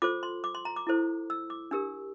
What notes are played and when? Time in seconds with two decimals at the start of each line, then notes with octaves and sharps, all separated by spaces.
0.02 F4 A4 C5 D6
0.23 C6
0.44 D6
0.55 C6
0.65 A#5
0.76 D6
0.87 E4 A4 C5
1.30 E6
1.50 D6
1.71 D4 G4 A#4 E6